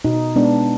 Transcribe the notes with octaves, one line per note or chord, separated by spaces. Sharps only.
B2 D#4
G#3 B3 D4